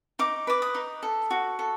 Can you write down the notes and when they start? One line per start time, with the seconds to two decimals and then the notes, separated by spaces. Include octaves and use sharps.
0.19 D#4 D6
0.47 B4 D6
0.62 D#6
0.75 D#4
1.03 A4
1.31 F#4
1.59 A4